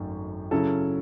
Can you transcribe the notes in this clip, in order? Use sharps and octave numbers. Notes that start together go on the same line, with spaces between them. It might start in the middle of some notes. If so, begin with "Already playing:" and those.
Already playing: G#1 F#2 D#3 A3
C#3 F#3 C#4 E4 A4